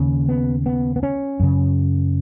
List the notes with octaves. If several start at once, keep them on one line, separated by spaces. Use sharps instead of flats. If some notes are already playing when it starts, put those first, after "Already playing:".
Already playing: D#2 C#3
B3
B3
B3
C#4
F#2 C#3